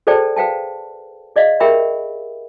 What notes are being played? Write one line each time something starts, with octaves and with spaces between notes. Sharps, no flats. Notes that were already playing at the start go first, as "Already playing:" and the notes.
G#4 A4 C5 D5 G5 A5
B4 F5 G5 A5
G#4 D5 D#5 F5
G4 G#4 A#4 E5 G5 B5